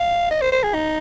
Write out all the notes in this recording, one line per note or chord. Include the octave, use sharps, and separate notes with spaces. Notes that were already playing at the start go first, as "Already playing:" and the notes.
Already playing: F5
D#5
C5
C5
G#4
D#4